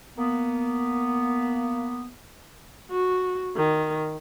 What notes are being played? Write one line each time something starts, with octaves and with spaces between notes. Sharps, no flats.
A#3 B3
F#4
D#3